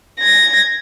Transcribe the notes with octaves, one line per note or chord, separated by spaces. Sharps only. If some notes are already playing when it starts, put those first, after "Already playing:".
G#6 A#6